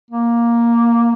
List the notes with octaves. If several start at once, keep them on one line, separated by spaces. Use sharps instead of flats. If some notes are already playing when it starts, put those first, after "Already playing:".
A#3